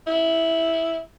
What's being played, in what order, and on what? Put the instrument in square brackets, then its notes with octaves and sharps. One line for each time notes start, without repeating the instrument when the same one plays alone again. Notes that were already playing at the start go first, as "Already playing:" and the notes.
[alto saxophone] E4